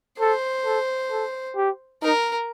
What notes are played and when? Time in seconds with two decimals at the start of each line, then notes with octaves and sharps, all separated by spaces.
0.20 A4 C5
0.66 A4
1.11 A4
1.56 G4
2.02 D#4 A#4